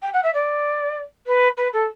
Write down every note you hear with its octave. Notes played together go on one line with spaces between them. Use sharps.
G5
F#5
E5
D5
B4
B4
A4